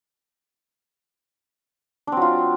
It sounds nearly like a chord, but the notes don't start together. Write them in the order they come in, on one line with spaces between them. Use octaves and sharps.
D4 C4 F#3 F4